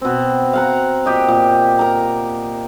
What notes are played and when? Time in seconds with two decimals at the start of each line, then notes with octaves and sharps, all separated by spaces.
0.01 B2 C4
0.53 F5 F#5 A#5
1.06 A#2 G4 D#5
1.28 A#2
1.79 A#4 A#5